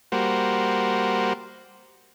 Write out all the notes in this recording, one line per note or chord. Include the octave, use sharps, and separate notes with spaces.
G3 A#3 F#4 C5